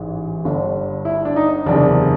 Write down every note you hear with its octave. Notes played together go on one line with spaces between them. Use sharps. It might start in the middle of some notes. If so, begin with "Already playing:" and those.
Already playing: A1 G#2 E3
G1 G2 D3
E4
D4
D#4
F#1 E2 C3 D4